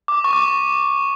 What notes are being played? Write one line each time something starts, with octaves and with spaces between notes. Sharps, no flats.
D6
C#6
D6
C#6